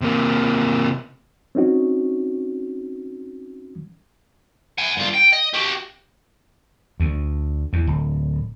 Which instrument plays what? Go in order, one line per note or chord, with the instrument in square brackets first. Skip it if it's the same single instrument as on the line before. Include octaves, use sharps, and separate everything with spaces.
[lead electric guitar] C3 A#3
[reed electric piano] C4 C#4 D#4 F#4
[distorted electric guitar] F#5 G#5
G2 F4
G5
D#5
F#4 G4
[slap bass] D2
E2
D1